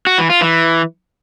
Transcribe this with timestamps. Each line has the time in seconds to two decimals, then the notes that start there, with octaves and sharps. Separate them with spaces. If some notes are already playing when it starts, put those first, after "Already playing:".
0.07 F#4
0.18 E3
0.30 F4
0.41 E3